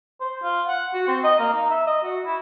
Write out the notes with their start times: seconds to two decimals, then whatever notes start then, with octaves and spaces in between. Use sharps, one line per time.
0.21 C5
0.42 F4
0.67 F#5
0.94 F#4
1.07 C4
1.24 D#5
1.39 A#3
1.53 D#4
1.70 E5
1.87 D#5
2.03 F#4
2.25 E4